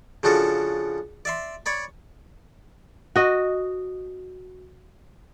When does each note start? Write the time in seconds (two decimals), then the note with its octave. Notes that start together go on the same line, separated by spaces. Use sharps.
0.23 C#3 F3 D4 F#4 A4
1.25 D5 E5 C6
1.66 C#5 D5 B5
3.16 F#4 D#5